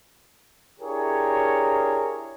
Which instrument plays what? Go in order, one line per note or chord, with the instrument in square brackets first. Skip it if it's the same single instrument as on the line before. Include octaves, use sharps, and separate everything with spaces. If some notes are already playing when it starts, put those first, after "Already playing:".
[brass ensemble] D4 E4 G4 G#4 A#4 C#5